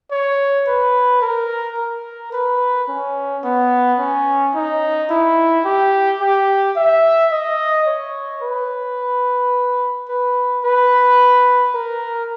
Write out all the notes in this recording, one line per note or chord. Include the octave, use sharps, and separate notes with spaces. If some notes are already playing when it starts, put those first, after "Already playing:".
C#5
B4
A#4
A#4
B4
C#4
B3
C#4
D#4
E4
G4
G4
E5
D#5
C#5
B4
B4
B4
A#4